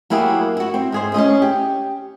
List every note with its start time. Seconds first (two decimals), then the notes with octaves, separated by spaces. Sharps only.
0.10 F#3 A#3 E4 G4 G#4
0.57 E4 F#4
0.74 C4
0.92 G#2 G#4 C5
1.14 C#4 E4 G#4 D#5
1.42 G4